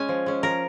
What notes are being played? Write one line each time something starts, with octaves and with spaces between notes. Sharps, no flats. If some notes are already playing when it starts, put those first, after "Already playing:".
Already playing: G#3 C#4 G#5
F3
G#3 C#4
F3 A#4